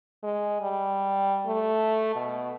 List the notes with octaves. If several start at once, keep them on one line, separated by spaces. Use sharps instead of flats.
G#3
G3
A3
B2